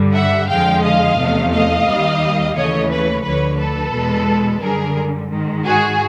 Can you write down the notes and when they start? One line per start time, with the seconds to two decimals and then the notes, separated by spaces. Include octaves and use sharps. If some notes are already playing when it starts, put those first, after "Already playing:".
Already playing: G2 D3 G3
0.15 E5 F#5
0.49 F2 D3 F3 G#3 F5 G5
0.83 D#5 F5
1.18 E2 C3 F3 A3
1.52 D#5 F5
1.86 D#2 D#3 G3
2.55 D#2 C#3 E3 A3 C#5 D#5
2.90 B4 C#5
3.24 D2 D3 F3 B4 C#5
3.59 A4 B4
3.94 E2 B2 G#3
4.61 F#2 D3 G3 G#4 A#4
5.31 G#2 D#3 G#3
5.65 F#4 G#4